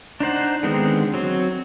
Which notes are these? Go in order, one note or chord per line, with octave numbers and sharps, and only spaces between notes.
D4 D#4 C5 F#5
D3 D#3 G#3 B3 C4
F#3 C4